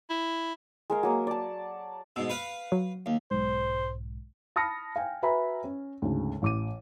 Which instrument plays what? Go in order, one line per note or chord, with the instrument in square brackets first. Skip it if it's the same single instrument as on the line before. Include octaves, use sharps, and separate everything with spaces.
[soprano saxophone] E4
[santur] G#3 A#4 F5
F#3 A#3 D#6
D5 A5
[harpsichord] G#2 B2 [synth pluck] E6
[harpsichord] B4 F5 F#5
[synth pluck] F#3
[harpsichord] D#2
[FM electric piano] B1 G#2 [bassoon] C5
[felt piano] A5 B5 D#6 F6 A#6 C#7
F5 G5 G#5
F#4 B4 E5 G#5 A#5 B5
C#4
D2 G#2 C#3
A1 D6 D#7